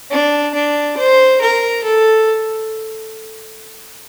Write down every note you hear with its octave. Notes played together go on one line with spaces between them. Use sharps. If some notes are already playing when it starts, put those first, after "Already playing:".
D4
D4
C5
A#4
A4